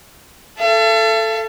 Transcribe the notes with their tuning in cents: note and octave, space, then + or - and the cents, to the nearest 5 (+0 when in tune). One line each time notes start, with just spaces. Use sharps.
A4 +0 E5 +45